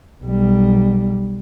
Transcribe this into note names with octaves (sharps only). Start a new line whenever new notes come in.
B1 G3